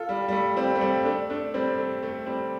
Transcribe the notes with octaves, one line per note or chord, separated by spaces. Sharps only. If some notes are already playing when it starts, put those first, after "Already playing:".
Already playing: F4 A4
G3
G3
A3
G3 C4
A3
G3 C4
A3 D4
A3 D4
G3 C4
A3
A3
G3 C4